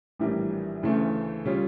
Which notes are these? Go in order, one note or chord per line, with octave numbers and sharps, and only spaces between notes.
A#1 A2 E3 G3 A#3
D2 C#3 E3 A3
C#3 G3 C#4 F4